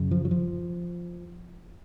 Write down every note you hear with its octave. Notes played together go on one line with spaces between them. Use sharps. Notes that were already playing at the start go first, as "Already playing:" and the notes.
Already playing: F#2 C#3
F3
F#3
F3